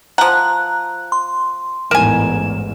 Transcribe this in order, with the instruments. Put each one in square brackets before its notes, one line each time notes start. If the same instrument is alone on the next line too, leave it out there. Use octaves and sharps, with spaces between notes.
[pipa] F3 F#5 [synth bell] A#5 F#6
[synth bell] C6
[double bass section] A1 E2 G#2 [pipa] A#4 G#5 [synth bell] E7